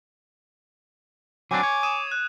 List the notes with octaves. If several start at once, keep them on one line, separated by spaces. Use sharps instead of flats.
F#3 C4 D4 G#5 D6
C#5
D#6 D#7 E7
F#6 G#6